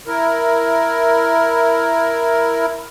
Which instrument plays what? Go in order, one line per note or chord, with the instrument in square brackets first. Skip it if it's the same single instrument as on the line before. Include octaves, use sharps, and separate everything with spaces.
[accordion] E4 A#4